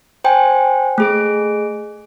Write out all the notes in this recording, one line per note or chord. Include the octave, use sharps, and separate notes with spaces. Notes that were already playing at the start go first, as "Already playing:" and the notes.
C5 G5 G#5
A3 G#4 D7